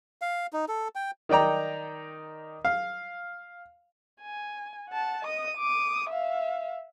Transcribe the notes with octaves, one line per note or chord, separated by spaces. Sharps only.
F5
D#4
A4
G5
D#3 D#4 D5 G5 A#5
F5
G#5
F#5 A5
D#5 D#6
D6 D#6
E5 F5